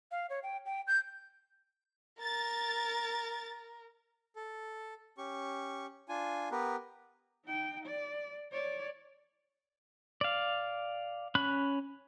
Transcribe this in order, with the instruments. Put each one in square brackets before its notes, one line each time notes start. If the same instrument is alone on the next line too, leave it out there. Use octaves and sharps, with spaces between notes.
[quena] F5
C#5
G5
G5
G6
[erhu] A#4 [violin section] A6
[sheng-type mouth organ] A4
C#4 G4 C#6
D4 F4 G#5
B3 G4 A#4 B4
[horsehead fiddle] D#4 G5
D5
C#5 D5
[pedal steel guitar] D5 F5
C#4 B5 F#6